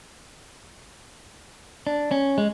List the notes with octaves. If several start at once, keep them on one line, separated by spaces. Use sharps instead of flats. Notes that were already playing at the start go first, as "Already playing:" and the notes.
D4
C#4
G#3